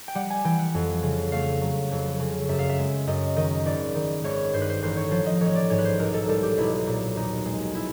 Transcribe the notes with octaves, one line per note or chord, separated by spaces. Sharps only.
G5
G3 F#5
G#5
E3 G5
F#5
F2
C#3
A3 F5
F#3
F2
C#3
F#2 E5
F5
E5
G#3
F#2 D#5
D#3 D#5
G#1 D5
D#3
G#1 C#5
G2 C5
B4
C5
A1 C5
C#5
F3 C5
D#5
A1 C#5
D5
G#2 C#5
B4
C5
B1 A#4
A4
G3 A4
G4
B1 E4
A#2
D#2 D#4
G#3
E4